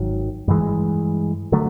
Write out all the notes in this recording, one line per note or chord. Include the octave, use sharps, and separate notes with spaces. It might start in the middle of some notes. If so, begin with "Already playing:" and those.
Already playing: G#1 D#3 F#3
G2 E3 G#3
D3 F#3 A3